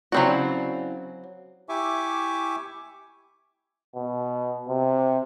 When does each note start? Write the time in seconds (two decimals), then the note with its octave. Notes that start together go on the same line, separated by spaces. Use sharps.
0.12 C#3 F#3 C4 E4 F#4 D5
1.69 E4 G4 E5 G#5 C#6 D6
3.95 B2
4.68 C3